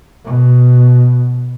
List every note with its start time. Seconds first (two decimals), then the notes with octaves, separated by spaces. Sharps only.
0.25 B2